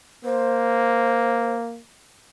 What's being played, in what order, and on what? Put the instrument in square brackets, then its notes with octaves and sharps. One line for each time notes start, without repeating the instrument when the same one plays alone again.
[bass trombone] A#3 [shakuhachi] C5